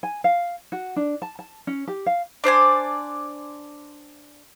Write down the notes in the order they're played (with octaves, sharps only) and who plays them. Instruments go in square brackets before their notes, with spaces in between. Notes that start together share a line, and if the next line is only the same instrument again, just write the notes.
[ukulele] G#5
F5
F#4
D4
A5
A5
C#4
G4
F5
[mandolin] D4 C5 D5 G#5